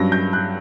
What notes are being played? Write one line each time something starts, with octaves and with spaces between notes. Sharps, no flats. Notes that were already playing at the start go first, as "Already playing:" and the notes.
Already playing: G2 F#3 C#4 A#6
G6
F#6